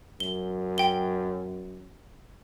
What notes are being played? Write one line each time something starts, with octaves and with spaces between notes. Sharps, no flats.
F#2 G7
G5 G7